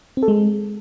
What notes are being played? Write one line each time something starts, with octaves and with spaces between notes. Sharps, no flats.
C4
A4
G#3